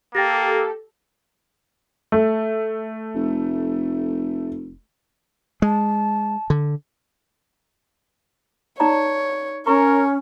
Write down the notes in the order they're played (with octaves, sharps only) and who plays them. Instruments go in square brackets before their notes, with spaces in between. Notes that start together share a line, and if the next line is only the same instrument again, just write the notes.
[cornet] A#3 [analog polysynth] G4 A4 [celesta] G5 A6 A#6
[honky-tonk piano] A3
[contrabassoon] F1
[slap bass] G#3 [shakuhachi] A5
[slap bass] D3
[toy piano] D#4 D5 A#5 [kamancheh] C#5
[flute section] C#4 [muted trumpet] A#4 [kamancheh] C#5 [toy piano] A#5 C#6